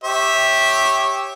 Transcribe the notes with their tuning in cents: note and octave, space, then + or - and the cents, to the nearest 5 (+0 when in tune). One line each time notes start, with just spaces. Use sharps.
G4 +0 C#5 -20 E5 -15